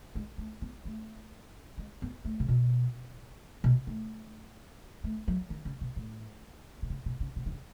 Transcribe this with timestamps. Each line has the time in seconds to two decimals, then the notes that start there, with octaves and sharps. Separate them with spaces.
0.15 G#3
0.38 A3
0.61 B3
0.85 A3
1.78 G#3
2.02 B3
2.25 A3
2.40 C#3
2.48 B2
3.64 B2
3.87 A3
5.04 A3
5.28 F#3
5.50 D#3
5.65 C#3
5.81 B2
5.96 A2
6.82 B2
6.90 C#3
7.06 B2
7.20 C#3
7.36 B2
7.46 D#3
7.52 C#3